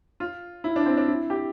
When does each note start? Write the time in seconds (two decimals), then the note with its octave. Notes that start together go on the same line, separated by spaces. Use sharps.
0.20 F4
0.64 E4
0.76 D4
0.86 C4
0.97 D4
1.08 E4
1.30 G4